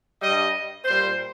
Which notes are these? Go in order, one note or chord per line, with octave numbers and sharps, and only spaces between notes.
G2 G3 D#5
A#2 G3 C5